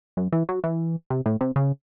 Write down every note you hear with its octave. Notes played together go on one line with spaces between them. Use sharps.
F#2
E3
F#3
E3
C3
A2
C3
C#3